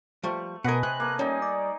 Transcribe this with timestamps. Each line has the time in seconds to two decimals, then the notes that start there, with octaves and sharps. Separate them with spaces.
0.23 F3 G3 A3 C#6
0.64 B2 A#4 B4 D#5 F#5 G#5
0.83 C3 F#6
1.00 A#3 A4
1.19 G3 C#4 D#4 G#5
1.42 D5